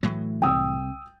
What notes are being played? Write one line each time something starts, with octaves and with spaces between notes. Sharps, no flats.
A2 E3 F#3 A3
C2 G5 D#6 E6